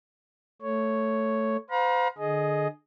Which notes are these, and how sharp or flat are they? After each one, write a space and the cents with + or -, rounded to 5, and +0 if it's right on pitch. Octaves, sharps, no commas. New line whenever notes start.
A3 +5 C#5 +0
C5 -35 F5 +35 A#5 +40
D3 +25 G#4 +15 D#5 +0